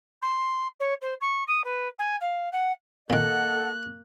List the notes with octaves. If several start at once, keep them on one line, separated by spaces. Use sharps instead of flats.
C6
C#5
C5
C#6
D#6
B4
G#5
F5
F#5
A#2 D#3 A#3 A4 D#5 F#5 F#6